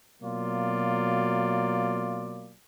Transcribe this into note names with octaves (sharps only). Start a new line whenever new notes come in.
B2 F#3 A#3 F4 D5